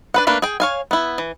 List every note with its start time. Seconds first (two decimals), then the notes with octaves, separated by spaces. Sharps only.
0.14 D4 B4 F#5
0.27 A3 A#3 D4 B4
0.42 G#4 G5
0.60 C#5 F5 G#5
0.91 B3 E4
1.18 E3